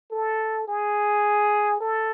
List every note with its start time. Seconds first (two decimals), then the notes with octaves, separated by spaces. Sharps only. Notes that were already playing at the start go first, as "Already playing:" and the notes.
0.11 A4
0.68 G#4
1.80 A4